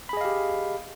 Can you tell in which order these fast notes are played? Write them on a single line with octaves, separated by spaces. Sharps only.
B5 G#4 D#5 F5 G4